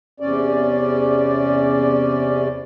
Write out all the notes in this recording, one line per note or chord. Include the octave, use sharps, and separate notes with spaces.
E2 C3 C#4 D5